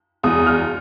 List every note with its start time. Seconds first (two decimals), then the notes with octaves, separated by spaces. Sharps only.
0.23 E2 D#6
0.46 F6